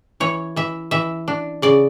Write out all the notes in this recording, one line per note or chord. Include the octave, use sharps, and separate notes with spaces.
E3 C#5
E3 E5
E3 E5
D4
C#3 D5